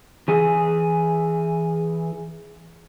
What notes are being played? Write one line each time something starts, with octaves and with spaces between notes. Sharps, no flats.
E3 G#4